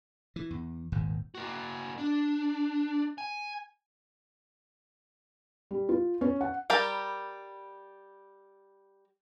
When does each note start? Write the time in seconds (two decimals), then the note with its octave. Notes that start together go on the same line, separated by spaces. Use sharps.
0.36 E3
0.50 E2
0.92 D#1 G#1 D#2 G#2
1.35 A#3 F#4
1.98 D4
3.18 G#5
5.71 G3
5.89 F4
6.21 C#4
6.41 F#5
6.70 G3 G4 A#4 A5 B5